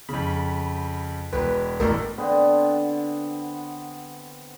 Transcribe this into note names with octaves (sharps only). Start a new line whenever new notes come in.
F2 C#3 B5
E1 B4
E1 A1 A2 A#4
D3 B3 C4